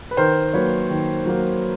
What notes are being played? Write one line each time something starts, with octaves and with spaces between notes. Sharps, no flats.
B4
D#3 A#4 C5
F#3 A#3 B4 C#5
D#3
F#3 A#3